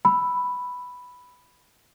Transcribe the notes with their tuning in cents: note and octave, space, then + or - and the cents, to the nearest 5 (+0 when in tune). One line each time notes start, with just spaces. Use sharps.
B5 +0 E6 +5